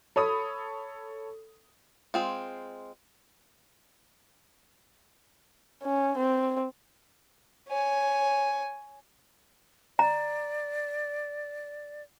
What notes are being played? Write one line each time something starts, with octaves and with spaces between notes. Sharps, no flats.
A4 C#5 B5 D#6
G#3 C4 F4
C#4
C4
C#5 G#5
D5 A#5